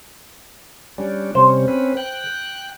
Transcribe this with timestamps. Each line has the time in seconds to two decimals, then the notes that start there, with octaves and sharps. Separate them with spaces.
0.98 G3 C#4 D4
1.35 C3 G3 C#4 C5
1.68 C4 C#4 B4
1.97 G5 F#6